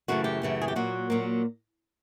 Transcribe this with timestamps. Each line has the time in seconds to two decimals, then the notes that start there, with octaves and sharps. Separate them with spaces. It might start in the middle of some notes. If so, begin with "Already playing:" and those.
0.08 F#2 C#3 E3 A3 F#4
0.24 G4
0.42 F#2 C#3 E3 A3
0.62 G#4
0.68 G4
0.76 A#2 F#3 A#3 F#4
1.10 A#2 F#3 A#3